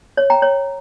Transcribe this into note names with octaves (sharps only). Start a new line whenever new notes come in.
C#5
G5 A#5
C#5